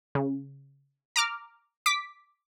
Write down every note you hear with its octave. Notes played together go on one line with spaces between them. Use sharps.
C#3
A#5 D6 F6
D6 B6